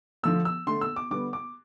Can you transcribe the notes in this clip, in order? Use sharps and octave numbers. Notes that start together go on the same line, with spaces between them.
D3 F3 A3 E6
E6
D3 A3 C6
E6
D6
D3 G3 B3 D6
D6